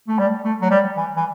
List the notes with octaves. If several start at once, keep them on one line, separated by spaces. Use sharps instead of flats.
A3
G3
A3
F#3
G3
E3
E3